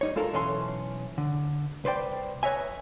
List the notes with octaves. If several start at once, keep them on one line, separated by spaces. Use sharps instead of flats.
G3 D#4 C#5
G#3 F4 A4 A#4
B1 E3 C#4 A4 G#5 C6
D3
C2 B4 C5 D5 G5
B4 C#5 D#5 E5 G#5